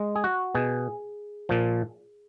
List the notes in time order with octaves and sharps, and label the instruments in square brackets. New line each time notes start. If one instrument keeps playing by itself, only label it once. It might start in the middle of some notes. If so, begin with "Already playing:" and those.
Already playing: [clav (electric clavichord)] G#3
G#4
F#4
B2 G#4
A#2 F3